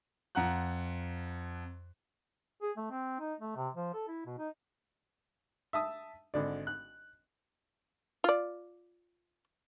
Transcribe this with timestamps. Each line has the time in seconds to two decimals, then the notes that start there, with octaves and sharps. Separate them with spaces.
0.35 F2 F4 F#5 A#5 F#6
2.62 G#4
2.77 A3
2.91 C4
3.20 D#4
3.40 A3
3.56 C3
3.74 F3
3.94 A4
4.08 E4
4.26 B2
4.39 D#4
5.73 E5 A5 D#6
6.34 G#1 D3 D5
6.67 F#6
8.24 F4 D5